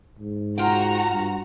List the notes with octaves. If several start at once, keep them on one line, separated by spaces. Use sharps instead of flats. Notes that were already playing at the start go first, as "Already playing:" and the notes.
G#2
F4 F#4 F#5 G5 A#5
G2